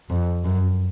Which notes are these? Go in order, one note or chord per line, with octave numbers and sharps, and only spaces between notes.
F2
F#2